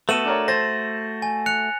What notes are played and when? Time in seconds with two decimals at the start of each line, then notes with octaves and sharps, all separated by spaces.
0.09 A3 B3 F#4 A4 D#7 E7 F#7
0.26 D4 A#4 C#5
0.48 C5 A6 A#6
1.22 G#5
1.46 F#6 C#7 F7